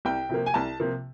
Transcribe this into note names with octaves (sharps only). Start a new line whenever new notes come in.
C2 G5
C3 F3 A#3
G#5
C2 A5
C3 F3 A#3